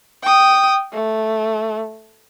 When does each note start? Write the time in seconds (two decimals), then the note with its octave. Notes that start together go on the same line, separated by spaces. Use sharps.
0.23 G5 D#6
0.93 A3